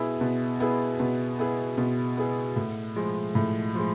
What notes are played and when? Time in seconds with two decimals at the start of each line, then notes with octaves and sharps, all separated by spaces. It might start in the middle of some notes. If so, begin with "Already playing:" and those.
Already playing: B2 B3 E4 G#4
0.21 B2
0.60 B3 E4 G#4
1.00 B2
1.39 B3 E4 G#4
1.78 B2
2.17 B3 E4 G#4
2.56 A2
2.96 F3 G#3
3.35 A2
3.75 F3 G#3